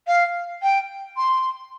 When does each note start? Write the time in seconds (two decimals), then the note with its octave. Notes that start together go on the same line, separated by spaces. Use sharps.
0.07 F5
0.62 G5
1.17 C6